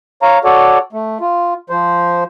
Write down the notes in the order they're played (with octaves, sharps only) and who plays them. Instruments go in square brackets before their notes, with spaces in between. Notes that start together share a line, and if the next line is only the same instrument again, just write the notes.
[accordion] C#5 F5 A#5
F#4 A4 C#5 D5
A3
F4
F3 C5